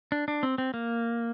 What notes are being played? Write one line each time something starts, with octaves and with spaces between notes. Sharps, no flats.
D4
D4
C4
C4
A#3